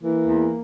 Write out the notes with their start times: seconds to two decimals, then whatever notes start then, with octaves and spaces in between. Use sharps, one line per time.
0.02 E3 A#3
0.26 E2